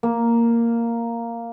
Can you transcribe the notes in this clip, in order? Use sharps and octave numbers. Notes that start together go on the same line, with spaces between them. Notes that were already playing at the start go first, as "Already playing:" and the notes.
A#3